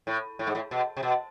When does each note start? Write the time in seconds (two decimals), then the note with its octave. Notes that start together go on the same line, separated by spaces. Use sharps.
0.07 A2
0.39 A2
0.47 G#2
0.55 A2
0.71 B2
0.97 C3
1.03 B2